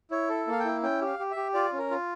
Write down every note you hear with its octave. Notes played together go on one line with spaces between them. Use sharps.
E4 C#5
A4
A#3 F5
G5
E4
C#4 G5
G4 F5
G4
E5
G4
F4 D5
C#4
A#4
F4